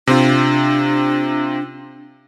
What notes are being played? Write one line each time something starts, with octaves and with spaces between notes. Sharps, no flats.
C3 C4 D4 F4